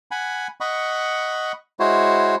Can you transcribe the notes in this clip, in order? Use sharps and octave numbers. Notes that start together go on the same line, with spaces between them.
F#5 G#5 B5
D#5 F#5 B5 C#6
G#3 E4 F#4 C5 C#5